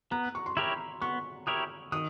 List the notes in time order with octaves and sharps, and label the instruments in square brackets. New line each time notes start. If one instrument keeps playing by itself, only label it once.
[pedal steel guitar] B3 [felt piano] A#5
[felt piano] C#6
C6
[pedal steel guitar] E4 G4 A#4 C#5 [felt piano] B5
[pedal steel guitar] B3 [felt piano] C#6
[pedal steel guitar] E4 G4 A#4 C#5 [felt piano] D#6
[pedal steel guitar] D#3 [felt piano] D#6